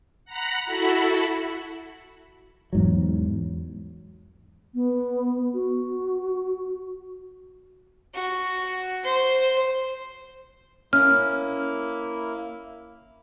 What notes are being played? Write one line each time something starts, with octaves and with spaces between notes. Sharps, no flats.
F#5 A#5 B5
E4 F#4 A4 B5
E2 G#2 F#3
B3
F#4
F#4
C5
A#3 C#4 E4 F6